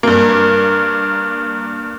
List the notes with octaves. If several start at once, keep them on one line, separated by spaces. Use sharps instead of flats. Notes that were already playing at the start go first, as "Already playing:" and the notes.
G2 A#3